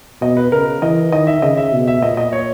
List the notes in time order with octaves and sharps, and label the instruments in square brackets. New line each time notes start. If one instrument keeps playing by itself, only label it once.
[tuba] B2 [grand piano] D#5
[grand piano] B4
[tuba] C#3 [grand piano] A#4
[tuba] E3 [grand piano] D#5
[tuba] D#3 [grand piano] D#5
[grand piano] E5
[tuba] C#3 [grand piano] D#5
[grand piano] E5
[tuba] B2
[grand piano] E5
[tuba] A#2 [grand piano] D#5
[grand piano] D#5
C#5